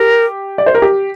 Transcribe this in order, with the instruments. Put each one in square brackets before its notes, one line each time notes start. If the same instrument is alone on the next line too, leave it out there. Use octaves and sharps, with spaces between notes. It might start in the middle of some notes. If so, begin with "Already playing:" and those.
Already playing: [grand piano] G4 [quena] A#4
[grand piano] D5
C5
A#4
G4